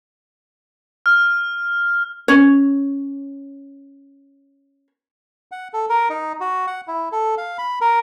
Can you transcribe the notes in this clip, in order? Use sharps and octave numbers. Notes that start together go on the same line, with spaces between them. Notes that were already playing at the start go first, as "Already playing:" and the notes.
F6
C#4 C#5
F#5
A4
A#4
D#4
F#4
F#5
E4
A4
F5
B5
A#4